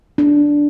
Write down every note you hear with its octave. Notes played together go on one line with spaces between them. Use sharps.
D4